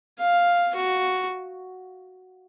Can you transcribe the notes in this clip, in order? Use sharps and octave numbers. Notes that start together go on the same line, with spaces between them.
F5
F#4